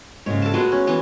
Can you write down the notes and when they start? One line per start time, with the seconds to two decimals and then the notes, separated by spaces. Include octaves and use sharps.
0.26 G#2 C#3 C#5
0.42 A4 A5
0.54 G#3 A3 B3 F#4
0.72 C#4
0.87 E3 B3